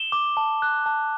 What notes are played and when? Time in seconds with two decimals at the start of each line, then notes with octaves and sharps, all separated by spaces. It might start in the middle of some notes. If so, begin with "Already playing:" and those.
Already playing: E7 G7
0.12 D6
0.37 A5
0.62 F#6
0.86 A5